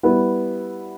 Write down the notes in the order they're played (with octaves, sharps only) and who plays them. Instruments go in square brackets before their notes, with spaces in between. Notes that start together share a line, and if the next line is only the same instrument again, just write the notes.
[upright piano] G3 B3 E4